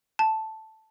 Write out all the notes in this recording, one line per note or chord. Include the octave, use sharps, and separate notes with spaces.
A5